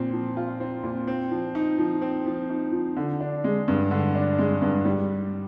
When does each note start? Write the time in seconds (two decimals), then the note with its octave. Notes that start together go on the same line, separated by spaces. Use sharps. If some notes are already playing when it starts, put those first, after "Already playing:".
Already playing: A#2 F3 C4
0.13 F3
0.37 F4
0.60 C4
0.83 A#2
1.07 C4
1.31 F3
1.55 D#4
1.78 F3
2.01 C4
2.26 F3
2.50 D#4
2.73 F3
2.96 D3
3.20 D4
3.44 G#3
3.68 G2
3.91 D3
4.15 D4
4.39 G#3
4.62 G2
4.85 G3